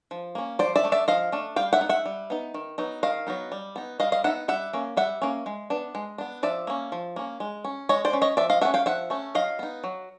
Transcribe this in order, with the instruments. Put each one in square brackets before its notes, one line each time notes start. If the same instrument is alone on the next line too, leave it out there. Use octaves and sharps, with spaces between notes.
[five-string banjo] F3
A#3 C#4
F3 C5 D5
D5 E5
A3 D4
D5 E5
F3 D#5 F5
A3 D4
G3 F5 G5
E5 F#5
B3 D#4
E5 F#5
G3
B3 D#4
D#3
F#3 B3 D#4
D#3 D#5 F5
F#3 B3 D#4
G3
B3 D#4
G3 D#5 F5
D#5 F5
B3 D#4 E5 F#5
G3 E5 F#5
A#3 C#4
G3 E5 F#5
A#3 C#4
G#3
B3 D4
G#3
B3 D4
F3 D5 E5
A#3 C#4
F3
A#3 C#4
G#3
C#4
G#3 C#5 D#5
C5 D5
C#4
C#5 D#5
F3 D5 E5
D#5 F5
A3 C#4 E5 F#5
F5 G5
F3 E5 F#5
A3 C#4
F#3 D#5 F5
B3 D#4
F#3